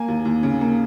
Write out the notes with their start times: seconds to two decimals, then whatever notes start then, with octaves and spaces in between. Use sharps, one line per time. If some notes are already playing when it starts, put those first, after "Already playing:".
Already playing: A#3 G#5
0.08 D#2
0.25 D#2
0.43 C#3
0.61 A#3